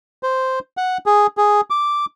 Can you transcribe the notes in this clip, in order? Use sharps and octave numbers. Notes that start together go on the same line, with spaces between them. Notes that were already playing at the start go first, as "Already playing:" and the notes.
C5
F#5
G#4
G#4
D6